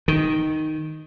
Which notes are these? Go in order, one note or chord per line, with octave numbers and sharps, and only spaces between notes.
D#3